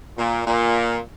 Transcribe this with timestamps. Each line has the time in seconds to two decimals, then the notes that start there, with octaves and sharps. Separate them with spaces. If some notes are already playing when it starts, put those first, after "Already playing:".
0.18 A#2
0.47 A#2